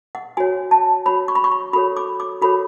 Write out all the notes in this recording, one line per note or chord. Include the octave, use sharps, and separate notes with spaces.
F#5
F#4 C#5 G#5
A5
F#4 C#5 B5
C#6
B5
C#6
B5
F#4 A4 C#5 B5
D6
D6
F#4 A4 C#5 B5